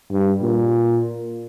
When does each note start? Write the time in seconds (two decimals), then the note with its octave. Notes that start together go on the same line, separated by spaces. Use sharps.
0.11 G2
0.41 A#2